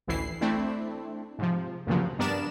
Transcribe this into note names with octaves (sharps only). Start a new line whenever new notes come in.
A1 D2 E3 E4 C7
A3 C4 D4 E4
G#2 C3 F3
D2 G2 A#2 C#3 F3 F#3
G2 B3 D4 A#4 D5 E7